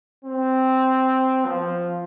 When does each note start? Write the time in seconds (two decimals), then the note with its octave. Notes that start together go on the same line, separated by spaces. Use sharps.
0.25 C4
1.46 F3